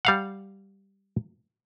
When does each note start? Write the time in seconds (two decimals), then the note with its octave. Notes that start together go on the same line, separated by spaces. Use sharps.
0.05 G3 F5 F#5